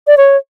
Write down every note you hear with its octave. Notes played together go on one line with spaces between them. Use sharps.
D5
C#5